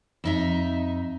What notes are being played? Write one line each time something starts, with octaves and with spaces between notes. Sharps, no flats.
F2 D#4 E5